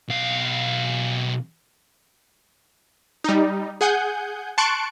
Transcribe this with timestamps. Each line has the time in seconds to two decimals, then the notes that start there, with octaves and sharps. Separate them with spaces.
0.08 B1 F5
3.24 G3 D#4
3.81 G#4 F#5 G#5 G6
4.58 A5 C6 C#6 F#6 C#7 D7